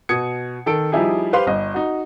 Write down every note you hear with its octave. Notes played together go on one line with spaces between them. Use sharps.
B2 D#6 G#6 C#7
D#3 A4 D7
F3 G3 D#4 E4 G4 G#4
G4 B4 C5 F5 C6
G1 D#5
D#4 F#4